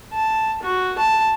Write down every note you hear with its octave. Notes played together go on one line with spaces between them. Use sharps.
A5
F#4
A5